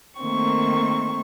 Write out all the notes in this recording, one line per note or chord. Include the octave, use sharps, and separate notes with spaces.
D#3 A3 A#3 C4 C#6